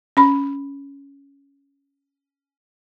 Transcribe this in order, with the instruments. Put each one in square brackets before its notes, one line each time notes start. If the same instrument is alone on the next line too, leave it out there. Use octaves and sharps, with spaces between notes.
[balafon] C#4 B5